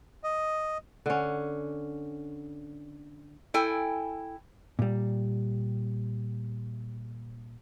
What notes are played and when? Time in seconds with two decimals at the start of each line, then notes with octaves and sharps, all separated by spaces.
0.24 D#5
1.06 D3 C#4
3.54 E4 A4 G5 G#5
4.79 A#2 G3